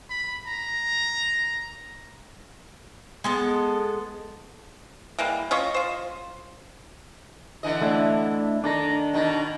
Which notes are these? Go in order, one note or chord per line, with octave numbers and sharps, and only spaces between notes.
B5
A#5
G#3 B3 A4
E3 G3 G#3 A#3
C#4 F4 D#5 C#6
F4 C5
D3 E3 D#5
A3 D4 E4
D#3 D4 A4 A#5
B2 D#3 D#4